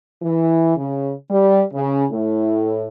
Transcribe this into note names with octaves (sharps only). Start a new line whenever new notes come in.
E3
C#3
G3
C#3
A2